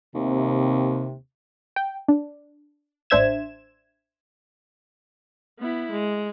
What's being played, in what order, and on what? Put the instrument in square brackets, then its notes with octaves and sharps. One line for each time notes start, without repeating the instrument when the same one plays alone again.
[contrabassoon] D#2 [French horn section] C3
[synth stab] G5
D4
A1 D4 C5 E5 G#6 E7
[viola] B3 E4
G#3